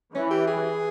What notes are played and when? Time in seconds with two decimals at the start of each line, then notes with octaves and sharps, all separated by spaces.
0.15 E3 C#4
0.31 G4
0.47 G#4